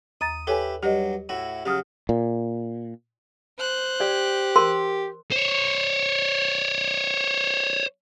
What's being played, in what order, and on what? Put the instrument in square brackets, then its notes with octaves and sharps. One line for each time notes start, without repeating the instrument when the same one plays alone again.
[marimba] D#2 A#5 A6 [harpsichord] D#6
[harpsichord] E4 G4 B4 [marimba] A4 C#5 G#5
[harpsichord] G2 F#3 [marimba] G4 C#5 D#5
[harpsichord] A2 E4 F#4
[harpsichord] C#3 F#3 [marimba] G4 D#6 F6
[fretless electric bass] A#2
[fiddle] C5 F#6
[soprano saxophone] G4 [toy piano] D5
[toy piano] A#4 C6
[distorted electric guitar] C5 C#5